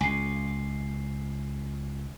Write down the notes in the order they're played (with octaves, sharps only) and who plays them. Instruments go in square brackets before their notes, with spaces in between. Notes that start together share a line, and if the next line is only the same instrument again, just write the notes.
[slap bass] C#2 [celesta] G#5 C7